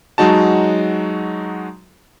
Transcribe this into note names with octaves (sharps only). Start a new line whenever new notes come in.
F#3 G#3 D#4 F#4 A5